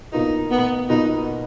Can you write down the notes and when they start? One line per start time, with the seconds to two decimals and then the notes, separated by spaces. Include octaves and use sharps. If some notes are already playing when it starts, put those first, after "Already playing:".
0.12 B2 A#3 D#4 F4 B4
0.51 B3
0.89 B2 A#3 D#4 F4 B4